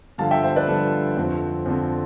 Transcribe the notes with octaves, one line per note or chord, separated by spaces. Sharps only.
G2 D3 F3 F5 A5
E5 G5
C5 E5
B4 D5
G2 D3 F3 A4
F2 D3 F3 C4
F2 D3 F3 C4